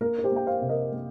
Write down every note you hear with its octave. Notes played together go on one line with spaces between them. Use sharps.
A#3 A#4
A#4
G4 C5
A#3 G5
C5 F5
C3
A#4 D#5
A#3